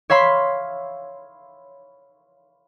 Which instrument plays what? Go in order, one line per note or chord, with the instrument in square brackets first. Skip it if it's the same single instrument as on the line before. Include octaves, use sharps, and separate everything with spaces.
[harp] C#5 E5 F5 B5 C6